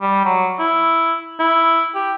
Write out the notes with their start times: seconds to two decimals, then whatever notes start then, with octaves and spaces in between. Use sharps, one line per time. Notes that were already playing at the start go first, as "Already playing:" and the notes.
0.02 G3
0.25 F#3
0.59 E4
1.39 E4
1.95 G4